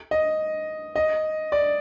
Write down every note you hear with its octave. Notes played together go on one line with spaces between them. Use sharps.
D#5
D#5
D5